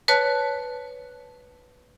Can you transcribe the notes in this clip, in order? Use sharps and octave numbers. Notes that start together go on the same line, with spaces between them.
B4 C#5 A5 F#6